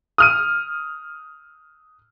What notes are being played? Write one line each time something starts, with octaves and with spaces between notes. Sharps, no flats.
D#6 F6 D#7